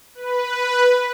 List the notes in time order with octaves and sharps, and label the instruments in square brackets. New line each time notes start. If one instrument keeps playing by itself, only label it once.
[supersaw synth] B4